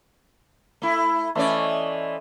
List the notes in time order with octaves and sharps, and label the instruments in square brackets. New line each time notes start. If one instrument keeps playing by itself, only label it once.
[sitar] A3 E4
[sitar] E3 C#4 D5 [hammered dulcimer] A3 D#5 C6